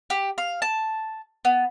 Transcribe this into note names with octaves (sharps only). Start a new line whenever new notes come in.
G4
F5
A5
B3